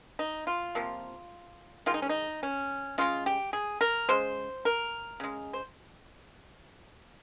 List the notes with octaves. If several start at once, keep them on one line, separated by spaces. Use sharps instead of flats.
D#4
F4
C3 F3 A#3
D#3 G#3 F4
D#4
C#4
D#4
C#4
C#3 G#3 F4
G4
G#4
A#4
C#3 G#3 C5
A#4
C#3 G#3
C5